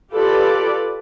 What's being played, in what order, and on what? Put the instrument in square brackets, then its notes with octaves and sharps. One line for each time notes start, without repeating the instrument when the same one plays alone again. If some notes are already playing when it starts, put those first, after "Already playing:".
[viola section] F4 G4 A4 B4 D5